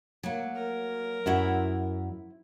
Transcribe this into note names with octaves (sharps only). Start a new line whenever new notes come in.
F#3 A#3
A#4
F#2 E4 F#4 C5